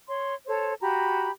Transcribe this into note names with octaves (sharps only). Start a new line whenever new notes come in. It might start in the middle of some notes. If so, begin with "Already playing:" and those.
C#5 C6
A4 C5 C#5
F#4 G4 A#5 B5